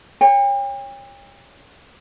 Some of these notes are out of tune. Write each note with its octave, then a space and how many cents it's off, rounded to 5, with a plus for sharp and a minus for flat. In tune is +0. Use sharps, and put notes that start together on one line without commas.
C#5 +0 G5 +40